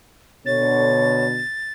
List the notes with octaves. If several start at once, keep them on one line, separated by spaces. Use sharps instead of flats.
B2 D3 C#5 A6